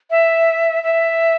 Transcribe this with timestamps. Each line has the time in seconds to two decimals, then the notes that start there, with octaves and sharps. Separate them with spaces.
0.11 E5
0.83 E5